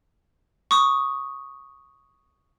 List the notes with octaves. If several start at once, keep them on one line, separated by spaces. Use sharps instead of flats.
C#6 D#6